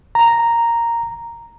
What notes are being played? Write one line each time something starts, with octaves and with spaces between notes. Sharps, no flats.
A#5